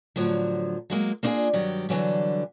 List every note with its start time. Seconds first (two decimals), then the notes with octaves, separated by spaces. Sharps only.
0.16 A2 D3 F3 F#3
0.90 F#3 G#3 A#3
1.23 A#3 B3 D4 E4 F4 G#4
1.53 G2 D#3 F#3 G4
1.89 D3 E3 F#3 G3